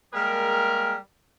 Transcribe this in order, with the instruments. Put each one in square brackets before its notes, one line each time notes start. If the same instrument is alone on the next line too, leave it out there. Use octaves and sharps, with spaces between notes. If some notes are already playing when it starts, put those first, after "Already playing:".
[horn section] G3 G#3 A#3 G#4 A#4